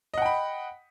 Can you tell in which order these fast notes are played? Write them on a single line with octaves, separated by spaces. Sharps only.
D#5 F#5 G5 B5